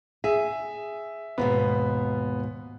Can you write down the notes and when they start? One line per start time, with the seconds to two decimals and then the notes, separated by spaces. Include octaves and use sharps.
0.24 G#4 E5
1.38 D#2 G#2 B2 B3